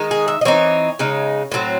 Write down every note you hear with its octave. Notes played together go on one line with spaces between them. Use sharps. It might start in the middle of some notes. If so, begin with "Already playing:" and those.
Already playing: D#3 G#3 D#4
G#4
E5
D#5
E3 C4 D#4 C#5
C#3 G#3 D#4
A2 F#3 C4